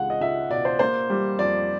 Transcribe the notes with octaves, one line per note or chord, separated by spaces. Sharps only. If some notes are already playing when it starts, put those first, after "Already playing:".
Already playing: C#2 G#3 F5 F#5
D#5
C#2 E5
B2 D5
C5
A#3 C5
G3
F2 D5